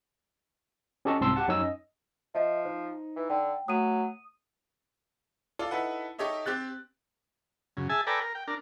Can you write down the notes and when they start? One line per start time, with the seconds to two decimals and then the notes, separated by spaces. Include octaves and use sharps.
1.05 C#4 G4 A4 D#5 A5 C#6
1.21 C2 G#2 C4 A5 C6 E6
1.36 G4 F#5 A5
1.48 F#2 C#4 D#4 C#5 G#5 E6
1.61 D#5
2.35 F3 D#5 E5
2.65 D#4 C5
3.16 E3
3.30 D3 G5
3.68 F#3 A3 D#6 D#7
5.59 F4 A4 D5
5.71 D#4 E4 A4 B4 F#5
6.19 D#4 G4 A4 C#5 D#5 E5
6.46 C4 G4 F#6 A6
7.77 F#2 C#3
7.89 G#4 E5 G#5 A5
8.07 A4 B4 D5 G5 G#5 A#5
8.21 A#4
8.35 G5
8.47 D4 A#4